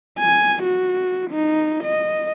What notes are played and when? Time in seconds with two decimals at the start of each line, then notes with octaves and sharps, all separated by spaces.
0.19 G#5
0.63 F#4
1.31 D#4
1.84 D#5